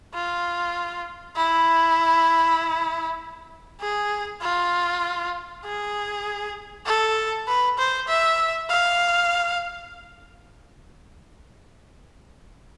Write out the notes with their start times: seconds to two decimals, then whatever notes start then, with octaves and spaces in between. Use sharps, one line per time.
0.14 F4
1.36 E4
3.80 G#4
4.41 F4
5.64 G#4
6.86 A4
7.47 B4
7.78 C5
8.08 E5
8.69 F5